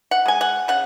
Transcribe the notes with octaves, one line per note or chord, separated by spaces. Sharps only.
F#5
G#3 G#5
F#5
C#3 F#5